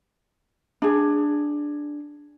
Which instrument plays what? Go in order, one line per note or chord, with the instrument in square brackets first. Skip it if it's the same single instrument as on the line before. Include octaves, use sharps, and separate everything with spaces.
[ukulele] D4 G#4